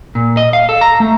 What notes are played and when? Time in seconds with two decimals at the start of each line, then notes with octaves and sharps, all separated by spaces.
0.15 A#2
0.37 D#5
0.53 F5
0.69 A4
0.81 A#5
1.00 A3